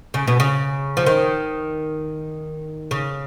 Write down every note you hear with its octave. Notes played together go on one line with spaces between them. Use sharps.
C#3
B2
C#3
F3
D#3
C#3